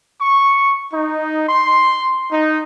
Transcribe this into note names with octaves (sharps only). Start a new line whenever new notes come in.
C#6
D#4
C6
D#4